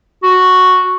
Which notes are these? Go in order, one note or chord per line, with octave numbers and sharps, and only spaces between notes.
F#4